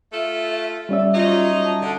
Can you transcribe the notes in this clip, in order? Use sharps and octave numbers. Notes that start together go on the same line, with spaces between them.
A3 F4 A4 E5
G3 C#4 D5 E5
F#3 D#4 F4 D#5
A5
D3